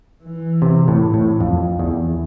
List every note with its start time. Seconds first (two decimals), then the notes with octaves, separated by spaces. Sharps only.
0.23 E3
0.62 C3
0.88 A2
1.14 A2
1.40 F2
1.79 E2